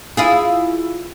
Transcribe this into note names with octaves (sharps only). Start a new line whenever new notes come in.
E4 F4 G#4